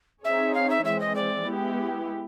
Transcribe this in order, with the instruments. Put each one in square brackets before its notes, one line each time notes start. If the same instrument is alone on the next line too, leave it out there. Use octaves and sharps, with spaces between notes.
[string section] C4 D#4 G#4 C#5 [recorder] E5
[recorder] F5
E5
[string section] E3 G#3 C4 [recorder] E5
[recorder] D#5
D5
[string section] G#3 B3 E4 G4